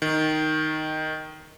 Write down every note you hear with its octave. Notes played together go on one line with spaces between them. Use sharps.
D#3